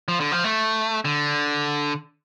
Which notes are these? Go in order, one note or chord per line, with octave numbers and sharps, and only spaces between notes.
F3
D3
F3
A3
D3